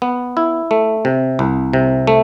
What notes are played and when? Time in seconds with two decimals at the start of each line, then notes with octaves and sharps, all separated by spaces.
0.02 B3
0.37 E4
0.71 A3
1.05 C3
1.39 C2
1.73 C3
2.07 A3